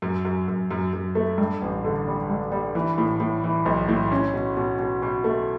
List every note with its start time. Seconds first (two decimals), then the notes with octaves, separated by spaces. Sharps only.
0.02 F#2
0.25 F#2
0.48 F#2
0.71 F#2
0.93 F#2
1.15 A3
1.38 G2
1.62 A1
1.84 D3
2.07 G3
2.30 G2
2.52 G3
2.75 E3
2.98 A2
3.20 A2
3.44 E3
3.66 B1
3.88 A2
4.12 C#4
4.33 B2
4.57 B2
4.79 B2
5.02 B2
5.24 A3